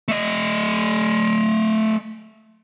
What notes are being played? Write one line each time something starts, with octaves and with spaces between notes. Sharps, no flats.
A3 D#5